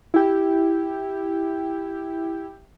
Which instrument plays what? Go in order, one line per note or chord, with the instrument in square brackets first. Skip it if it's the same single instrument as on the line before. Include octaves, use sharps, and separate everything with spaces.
[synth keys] E4 G4